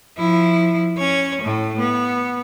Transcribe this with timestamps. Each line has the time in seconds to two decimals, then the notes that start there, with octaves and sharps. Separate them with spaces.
0.18 F3 E4
0.98 C#4 C#5
1.42 A2 A3
1.79 B3